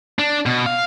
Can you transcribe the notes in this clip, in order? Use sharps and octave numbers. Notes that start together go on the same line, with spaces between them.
D4
B2
F5